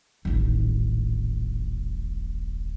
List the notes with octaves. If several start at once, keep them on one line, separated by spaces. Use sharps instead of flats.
D#1 A1